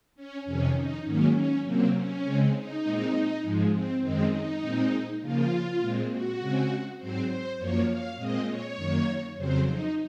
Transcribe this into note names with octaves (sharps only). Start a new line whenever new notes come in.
C#4
F2 C3 D#3 C#4
D#4
G#2 D#3 F#3 A#3 C#4
C#4
C3 F#3 A#3 C4
C#4
C#3 G#3 C4
D#4
A#2 G#3 C4
G#2 F3 G#3
C4
F#2 D#3 G#3 C4 D#4
D#4
A#2 G#3 C4
C#3 F3 A#3 F4
A#2 G#3 C4
F#4
C#3 G#3 C4
G#2 F#3 C4 C5
C5
F#2 F3 A#3 C#5
F5
A#2 G#3 C4 D#5
C#5
F#2 D#3 A#3
F2 C#3 F#3 C4 C5
D#4